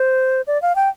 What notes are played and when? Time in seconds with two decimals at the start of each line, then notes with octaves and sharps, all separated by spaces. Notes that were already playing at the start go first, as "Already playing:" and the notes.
Already playing: C5
0.47 D5
0.62 F5
0.76 G5